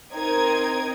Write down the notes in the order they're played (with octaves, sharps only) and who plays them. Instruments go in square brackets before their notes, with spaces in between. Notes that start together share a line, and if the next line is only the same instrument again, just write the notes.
[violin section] C4 D#4 A#4 D#6 G#6